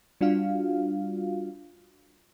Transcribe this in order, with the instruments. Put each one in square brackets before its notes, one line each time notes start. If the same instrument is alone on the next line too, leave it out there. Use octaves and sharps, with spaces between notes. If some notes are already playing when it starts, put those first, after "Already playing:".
[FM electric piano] G3 D4 F4 F#4 F5